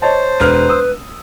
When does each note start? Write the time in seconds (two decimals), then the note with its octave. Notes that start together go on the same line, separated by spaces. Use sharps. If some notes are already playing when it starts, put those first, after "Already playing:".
0.02 C5 C#5 D#5 A5
0.40 E1 B4 F6
0.69 D#6 E6